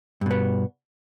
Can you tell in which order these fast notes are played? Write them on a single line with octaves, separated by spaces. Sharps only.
G2 B2 B3